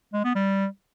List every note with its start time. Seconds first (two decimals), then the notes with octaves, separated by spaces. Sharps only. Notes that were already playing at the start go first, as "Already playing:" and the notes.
0.13 G#3
0.24 B3
0.35 G3